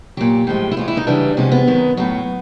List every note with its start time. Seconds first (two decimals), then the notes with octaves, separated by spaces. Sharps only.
0.17 A#2 F#3 G4
0.47 A2 F3 G#3
0.72 E4
0.77 A2 E3 G#3 F4
0.88 E4
0.97 D#4
1.07 F#2 C#3 E3 G3 D4
1.37 E2 C3 F3 G#3 C#4
1.52 B3
1.67 F#2 D#3 G#3
1.97 A2 F#3 B3